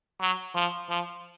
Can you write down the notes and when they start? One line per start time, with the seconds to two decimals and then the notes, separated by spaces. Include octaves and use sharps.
0.21 F#3
0.55 F3
0.90 F3